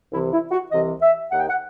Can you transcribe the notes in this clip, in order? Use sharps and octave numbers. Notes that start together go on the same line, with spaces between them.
C2 C3 E3 E4
E4
F#4
C2 C3 E3 D#5
E5
D#2 D#3 F#5
G5
F#5